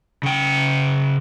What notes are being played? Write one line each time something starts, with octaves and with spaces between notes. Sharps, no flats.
C#3 G5